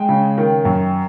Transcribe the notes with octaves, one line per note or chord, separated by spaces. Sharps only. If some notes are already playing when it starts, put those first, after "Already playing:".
Already playing: G#3 G5
C#3
D#3
F#2